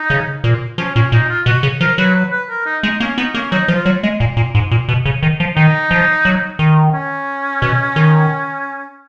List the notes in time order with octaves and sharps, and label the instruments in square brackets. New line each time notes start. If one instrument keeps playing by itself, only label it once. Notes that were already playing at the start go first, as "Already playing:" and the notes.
Already playing: [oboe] D#4
[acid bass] C#3
A#2
[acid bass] F3 [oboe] C#4
[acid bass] A#2 [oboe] C#4
[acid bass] A#2 [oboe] D#4
[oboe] F4
[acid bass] B2 [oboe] F#4
[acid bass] C#3
[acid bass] F3 [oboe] A#4
[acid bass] F#3 [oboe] B4
[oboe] B4
B4
A#4
D#4
[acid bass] G#3 [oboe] D#4
[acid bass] A#3 [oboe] C#4
[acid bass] B3 [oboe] D#4
[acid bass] A#3 [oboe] C#4
[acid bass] F#3 [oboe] D#4
[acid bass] F3
[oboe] F4
[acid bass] F#3
G#3
A#2
A#2
G#2
A#2
B2
C#3
D#3
F3
[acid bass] D#3 [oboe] D#4
[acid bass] F3
F#3
D#3
[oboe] C#4
[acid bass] B2
D#3